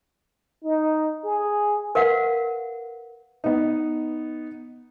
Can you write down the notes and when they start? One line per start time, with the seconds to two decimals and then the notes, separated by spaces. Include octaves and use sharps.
0.64 D#4
1.25 G#4
1.95 A#4 B4 F5 F#5
3.44 B3 D#4